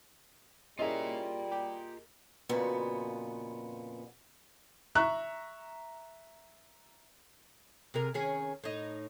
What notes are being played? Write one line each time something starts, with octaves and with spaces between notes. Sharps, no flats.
G3 A#3 C#4 E4 F4 G#4 D#5 A#5
G4
F2 A#2 C#3 B3 F#4
E5 A#5 C#6 F#6
C3 G#4 A#4
D#3 C#4 G#4
A2 D#4